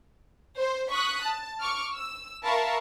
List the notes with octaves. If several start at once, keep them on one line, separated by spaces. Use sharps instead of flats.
C5
C#6 D#6 F#6 B6
A5
C#6 D6 F6
E6
A#4 E5 F5 A5 B5 C#6